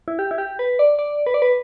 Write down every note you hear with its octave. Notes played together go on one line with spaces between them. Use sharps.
E4
G4
E4
G4
B4
D5
D5
B4
D5
B4